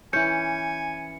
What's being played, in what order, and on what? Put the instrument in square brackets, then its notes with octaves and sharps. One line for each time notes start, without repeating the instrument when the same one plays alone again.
[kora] E3 C#4 [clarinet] G#5 [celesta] G6 [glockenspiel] C#7